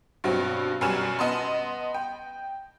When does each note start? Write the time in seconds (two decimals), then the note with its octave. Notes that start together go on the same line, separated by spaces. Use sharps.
0.24 G2 B2 F#3 C4
0.81 F#2 B2 G3 G#5 F6 E7
1.19 B3 D#5 A5 C6
1.94 G5